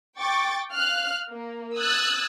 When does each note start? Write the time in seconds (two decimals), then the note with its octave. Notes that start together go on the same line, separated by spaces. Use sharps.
0.19 G5 C#6 D6 A6
0.72 F5 F6 F#6
1.31 A#3
1.77 D#6 E6 F#6 G#6 A6